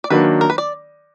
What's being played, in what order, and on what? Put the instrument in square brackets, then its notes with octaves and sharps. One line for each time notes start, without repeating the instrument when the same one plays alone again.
[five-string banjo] D5
[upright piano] D#3 F#3 A#3 D4 [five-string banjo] B4
[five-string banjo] A#4
B4
D5